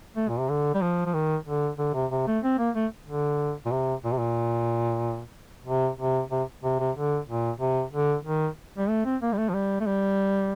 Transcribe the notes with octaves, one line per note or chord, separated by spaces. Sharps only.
A3
A#2
C3
D3
G3
F3
F3
D#3
D3
D3
C3
C3
A3
C4
A#3
A3
D3
A#2
C3
A#2
C3
A#2
C3
C3
C3
C3
C3
D3
A#2
C3
D3
D#3
G3
A3
C4
A#3
G3
A3
F3
G3
A3
G3